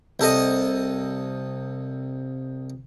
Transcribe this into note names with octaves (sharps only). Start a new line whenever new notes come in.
C2 A4 D#5